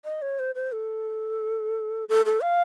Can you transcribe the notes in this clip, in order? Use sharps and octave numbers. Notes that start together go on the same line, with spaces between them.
D#5
C#5
C5
C5
A4
A4
A4
F5